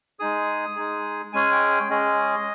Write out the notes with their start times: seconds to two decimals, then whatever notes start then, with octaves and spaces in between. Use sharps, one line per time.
0.20 G#3 D#4 G#4 D#6
0.76 G#3 D#4 G#4
1.33 G#3 C#4 G#4 G#5
1.52 G5
1.71 G5
1.90 G#3 C#4 G#4 D#5